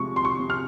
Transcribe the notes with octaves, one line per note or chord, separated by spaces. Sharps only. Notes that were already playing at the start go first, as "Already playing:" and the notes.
Already playing: C3 F3 G#3 C#6
C6
C#6
C3
F6